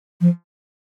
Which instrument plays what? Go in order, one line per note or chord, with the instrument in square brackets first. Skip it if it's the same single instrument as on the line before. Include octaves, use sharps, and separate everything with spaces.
[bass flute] F3